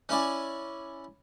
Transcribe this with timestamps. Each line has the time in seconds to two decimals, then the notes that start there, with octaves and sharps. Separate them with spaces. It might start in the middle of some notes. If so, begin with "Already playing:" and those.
0.09 C#4 E4 D5 G#5